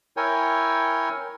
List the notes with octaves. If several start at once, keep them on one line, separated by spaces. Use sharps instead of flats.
E4 A#4 C#5 G5 G#5